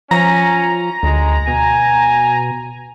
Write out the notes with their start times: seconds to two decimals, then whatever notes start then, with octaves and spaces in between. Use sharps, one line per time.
0.11 F3 C#4 A#5
1.03 D2 G#3
1.48 B2 G#5